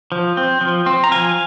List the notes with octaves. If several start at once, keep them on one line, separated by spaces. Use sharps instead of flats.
F3
C4
F3
C4
A#5
F3 F5 G#5